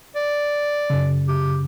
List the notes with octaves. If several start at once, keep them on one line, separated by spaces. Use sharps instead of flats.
D5
F#2 C#3
G4